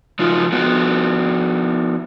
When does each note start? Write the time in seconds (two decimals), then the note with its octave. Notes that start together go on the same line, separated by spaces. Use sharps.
0.19 F3 F#3 D#4 F4
0.52 F3 B3 F#4